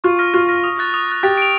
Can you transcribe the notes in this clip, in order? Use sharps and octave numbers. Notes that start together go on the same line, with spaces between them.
F4 C#6
F6 A#6
F4 C#6
F6 A#6
D#6
F#6 A6
D#6
F#6 A6
G4 A6
D7 F7